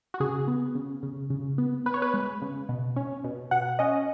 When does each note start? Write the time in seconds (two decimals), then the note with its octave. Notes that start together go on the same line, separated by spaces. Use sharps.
0.14 F#4
0.20 C#3 G#4
0.48 B3
0.75 C#3
1.03 C#3
1.30 C#3
1.58 B3
1.86 B3 B4
1.94 C#5
2.02 B4
2.14 G#3
2.42 C#3
2.69 B2
2.96 C#4
3.24 B2
3.51 B2 F#5
3.79 C#4 D#5